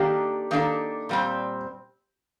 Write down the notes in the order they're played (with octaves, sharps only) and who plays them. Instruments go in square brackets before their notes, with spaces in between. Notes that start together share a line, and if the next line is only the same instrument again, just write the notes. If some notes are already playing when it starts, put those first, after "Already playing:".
Already playing: [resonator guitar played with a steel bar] D#3 A#3 D4 A4 [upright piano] G4
[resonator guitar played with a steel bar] D#3 A#3 D4 A4
A#2 G3 C4